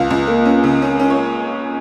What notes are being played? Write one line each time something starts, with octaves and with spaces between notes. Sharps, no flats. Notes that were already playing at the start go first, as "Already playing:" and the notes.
Already playing: C#2 F5
C#2
A#3
C#4
C#3
C#4
C#4
C#5